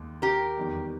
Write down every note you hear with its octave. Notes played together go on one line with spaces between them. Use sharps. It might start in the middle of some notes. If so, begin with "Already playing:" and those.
Already playing: D#2 G#3
G4 A#4
E2 D#3 G3